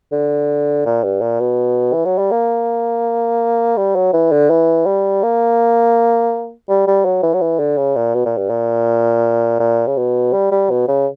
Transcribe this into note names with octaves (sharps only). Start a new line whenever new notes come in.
D3
A#2
G2
A#2
B2
E3
F#3
G3
A#3
G3
F#3
E3
D3
E3
G3
A#3
G3
G3
F#3
E3
F#3
E3
D3
C#3
A#2
B2
A#2
G2
A#2
A#2
C#3
B2
G3
G3
B2
C#3